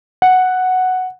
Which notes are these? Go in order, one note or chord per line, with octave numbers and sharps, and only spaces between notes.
F#5